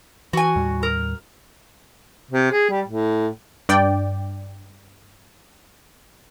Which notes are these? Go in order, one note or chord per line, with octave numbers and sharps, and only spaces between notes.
E3 F#4 G#5
D#2 A2 G3
A#4
C3
G#4
G3
A2
G2 D5 G5